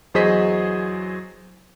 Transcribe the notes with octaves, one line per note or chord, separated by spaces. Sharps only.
E2 F#3 G#4 C5 D#5 B6